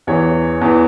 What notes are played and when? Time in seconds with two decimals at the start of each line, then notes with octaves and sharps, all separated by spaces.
0.07 E2 E3 C#5
0.61 E2 E3